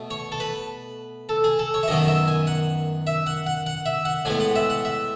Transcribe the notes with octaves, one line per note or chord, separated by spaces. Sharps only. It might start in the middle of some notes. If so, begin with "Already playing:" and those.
Already playing: B2 A3
C#5
A4
B4
A4
G#4
A4
C#5
E5
F#2 D#3 F#3 B3 D#5
E5
G#5
F#5
E5
F#5
F#5
F#5
E5
F#5
A2 G#3 B3 G#5
F#5
E5
F#5
E5